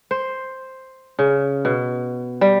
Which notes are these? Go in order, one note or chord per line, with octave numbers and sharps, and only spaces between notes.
C5
C#3
B2
G3